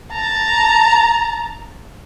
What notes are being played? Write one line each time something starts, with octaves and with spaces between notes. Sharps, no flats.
A5 A#5